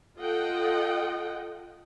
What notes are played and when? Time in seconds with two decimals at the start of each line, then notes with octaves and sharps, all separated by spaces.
0.18 F4 A4 D#5 F#5 G5